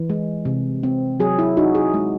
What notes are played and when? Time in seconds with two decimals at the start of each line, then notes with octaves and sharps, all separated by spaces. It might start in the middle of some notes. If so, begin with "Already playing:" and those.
Already playing: E3
0.10 G#3
0.45 C3
0.83 C4
1.20 F#3 G#4
1.39 E4
1.57 D#4 F#4
1.75 G#4
1.94 G#3